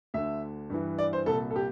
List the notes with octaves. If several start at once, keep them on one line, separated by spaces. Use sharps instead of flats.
D2 D3 E5
G2 E3
D5
C5
C2 A#2 A4
A4
G4